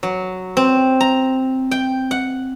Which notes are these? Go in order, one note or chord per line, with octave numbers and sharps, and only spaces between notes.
F#3
C4
A#5
G5
F#5